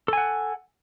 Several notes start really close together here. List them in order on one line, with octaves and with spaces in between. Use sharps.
A4 G#5 F#5